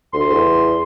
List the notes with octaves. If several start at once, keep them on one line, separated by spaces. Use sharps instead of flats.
D2 C6
E2